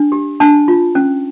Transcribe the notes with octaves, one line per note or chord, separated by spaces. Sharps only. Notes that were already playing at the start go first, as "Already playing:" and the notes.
Already playing: D4
G4
D4 A5
F4
C#4